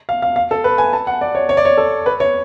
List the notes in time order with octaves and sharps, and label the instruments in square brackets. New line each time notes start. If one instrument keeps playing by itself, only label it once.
[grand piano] F5
F5
F5
A4
B4
G#5
A5
F#5
D5
C#5
C#5
D5
C#5
A4
B4
C#5